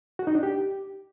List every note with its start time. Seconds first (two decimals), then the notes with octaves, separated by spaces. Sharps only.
0.19 F#4
0.27 D#4
0.35 D4
0.43 G4